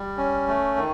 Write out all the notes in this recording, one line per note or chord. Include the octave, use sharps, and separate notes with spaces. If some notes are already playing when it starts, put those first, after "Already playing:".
Already playing: G3
C#4
A3
D#3